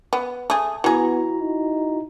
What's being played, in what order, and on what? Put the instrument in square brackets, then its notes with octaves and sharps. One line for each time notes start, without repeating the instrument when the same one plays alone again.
[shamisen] B3
[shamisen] A3 G#4 [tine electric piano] A5 D#6
[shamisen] E3 G#4 [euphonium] B3 [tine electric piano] E4 F#4 A#5
[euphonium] D#4